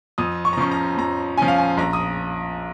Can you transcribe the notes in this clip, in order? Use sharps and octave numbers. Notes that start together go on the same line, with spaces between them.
F2 D#6
C#6
A#5
F3 C#4 C#6
A#5
F2 A#5
F3 C#4 G#5
F5
G#5
A#1 A#5
D#6